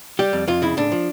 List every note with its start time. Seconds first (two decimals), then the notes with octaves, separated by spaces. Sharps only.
0.19 G3 G4
0.33 F2
0.47 F2 F4
0.62 C#3 E4
0.77 A2 D4
0.92 F3